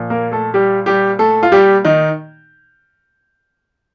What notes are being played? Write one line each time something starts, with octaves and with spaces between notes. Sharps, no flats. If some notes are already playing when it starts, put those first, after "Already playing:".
Already playing: A#2 F3
A#3 A#4
A3 A4
G3 G4
G3 G4
A3 A4
F4
G3 G4
D#3 D#4